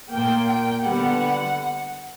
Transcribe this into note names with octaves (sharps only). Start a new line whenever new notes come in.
A#2 A#3 G5
G5
D3 G3 B3 F#5